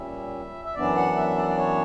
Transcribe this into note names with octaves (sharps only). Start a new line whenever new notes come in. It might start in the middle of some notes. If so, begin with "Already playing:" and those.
Already playing: A#2 G3 C#4 E5
E5
F#2 E3 B3 D4 D5
F#5
E5
D5
D5
C#5